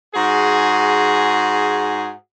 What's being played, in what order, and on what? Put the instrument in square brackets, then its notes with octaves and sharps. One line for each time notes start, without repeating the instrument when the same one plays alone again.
[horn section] G#2 F#4 G#4